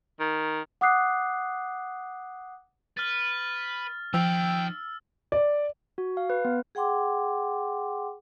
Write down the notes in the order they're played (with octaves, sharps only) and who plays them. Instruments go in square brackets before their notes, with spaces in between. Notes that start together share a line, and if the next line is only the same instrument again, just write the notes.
[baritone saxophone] D#3
[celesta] F#5 D6 D#6 F#6 C7
[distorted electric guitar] B4 [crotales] F6 A6
[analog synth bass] F3 [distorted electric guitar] D#4 F5 [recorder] G5 [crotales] E6
[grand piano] D5
[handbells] F#4
F5
B4
B3
[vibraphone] G#4 F#5 G5 C6 D6